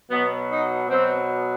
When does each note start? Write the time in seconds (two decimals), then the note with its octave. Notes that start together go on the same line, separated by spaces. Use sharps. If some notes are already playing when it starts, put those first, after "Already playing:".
0.10 B2 F#3 B3
0.51 D#4
0.90 B2 F#3 C4